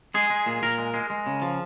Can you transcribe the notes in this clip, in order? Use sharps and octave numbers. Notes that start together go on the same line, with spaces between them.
G#3 G#4
G#3
A#2
A#2 A#4
G#3
G#3
G#3
C#3
F3